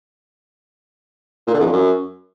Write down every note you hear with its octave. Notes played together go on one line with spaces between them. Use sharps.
A#2
D3
E2
F2
F#2